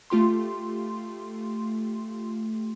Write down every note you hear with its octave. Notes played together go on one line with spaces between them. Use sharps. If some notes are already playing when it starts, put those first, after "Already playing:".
A3 F4 G4 C6